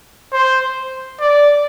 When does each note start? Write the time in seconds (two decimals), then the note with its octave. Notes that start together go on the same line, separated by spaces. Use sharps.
0.33 C5
1.20 D5